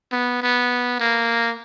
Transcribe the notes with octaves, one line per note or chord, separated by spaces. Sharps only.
B3
B3
A#3